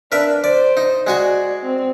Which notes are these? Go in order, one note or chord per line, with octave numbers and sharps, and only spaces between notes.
D4 A#4 B4 E5
C5 D5
D#4
G#3 F#4 D5 G#5
C4